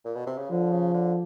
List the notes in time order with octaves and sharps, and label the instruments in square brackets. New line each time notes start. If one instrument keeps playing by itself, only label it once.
[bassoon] A#2
B2
C3
C#3
[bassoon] D3 [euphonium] F3
[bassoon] C#3
D3